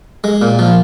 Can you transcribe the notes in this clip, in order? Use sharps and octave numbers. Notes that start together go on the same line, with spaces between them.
G#3
A#2
F3